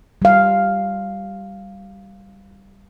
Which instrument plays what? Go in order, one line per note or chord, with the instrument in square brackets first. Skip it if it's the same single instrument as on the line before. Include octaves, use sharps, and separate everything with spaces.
[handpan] G3 F5